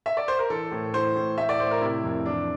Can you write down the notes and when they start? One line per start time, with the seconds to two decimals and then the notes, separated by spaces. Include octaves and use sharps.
0.06 E5
0.17 D5
0.28 C5
0.39 A#4
0.50 E3 A4
0.71 A2
0.94 E3 C5
1.16 A2
1.38 A2 E5
1.49 D5
1.60 A2 C5
1.71 A#4
1.81 C3 E4
2.04 F2
2.26 E3 D4